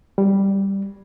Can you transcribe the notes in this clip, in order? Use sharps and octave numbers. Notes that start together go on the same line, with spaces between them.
G3